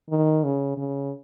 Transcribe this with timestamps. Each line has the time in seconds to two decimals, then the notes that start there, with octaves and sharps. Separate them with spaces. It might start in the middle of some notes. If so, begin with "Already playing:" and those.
0.10 D#3
0.44 C#3
0.77 C#3